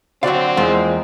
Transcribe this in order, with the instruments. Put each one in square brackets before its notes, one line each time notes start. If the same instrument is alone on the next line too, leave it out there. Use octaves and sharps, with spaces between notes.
[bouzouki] D3 F#3 [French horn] C4 [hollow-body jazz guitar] F#4 D5 F5
[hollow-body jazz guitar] E2 [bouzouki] F3 A#3 [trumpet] G#3